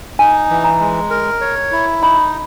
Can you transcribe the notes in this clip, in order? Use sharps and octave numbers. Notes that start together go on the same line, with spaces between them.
D#4 G#5
E3
A#5
G#3
A#4
C#5
E4
D#4 B5